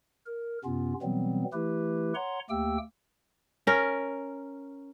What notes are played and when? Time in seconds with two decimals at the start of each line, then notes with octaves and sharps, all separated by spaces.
0.26 A#4
0.65 F#2 C3 B3 C#4 F4
1.02 B2 E3 F#3 G3 B3 C4
1.53 E3 A3 E4 G4 B4
2.15 C#5 F#5 A#5 C6
2.50 D2 A3 A#3 G4 G5 E6
3.67 C#4 A#4